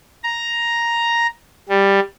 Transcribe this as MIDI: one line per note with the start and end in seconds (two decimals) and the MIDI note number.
0.24 1.27 82
1.69 2.00 55